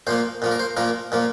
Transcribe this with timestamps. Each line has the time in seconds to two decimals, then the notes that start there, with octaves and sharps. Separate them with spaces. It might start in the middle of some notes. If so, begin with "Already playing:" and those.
0.07 A#2 F3 A#3 C5
0.42 A#2 F3 A#3
0.51 A#4
0.59 C5
0.77 A#2 F3 A#3 A#4
1.12 A#2 F3 A#3